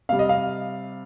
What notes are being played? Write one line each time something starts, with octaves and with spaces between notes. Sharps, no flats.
C3 G3 F5
D#5
F5